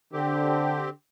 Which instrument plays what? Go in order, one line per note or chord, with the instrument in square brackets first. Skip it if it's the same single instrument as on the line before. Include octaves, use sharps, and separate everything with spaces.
[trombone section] D3 [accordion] C4 G4